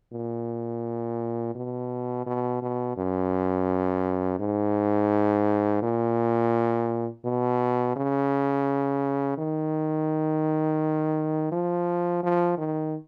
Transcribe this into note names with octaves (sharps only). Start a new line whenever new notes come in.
A#2
B2
B2
B2
F#2
G#2
A#2
B2
C#3
D#3
F3
F3
D#3